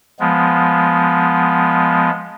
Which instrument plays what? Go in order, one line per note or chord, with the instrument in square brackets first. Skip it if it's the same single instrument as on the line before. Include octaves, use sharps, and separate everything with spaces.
[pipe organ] F3 G#3 B3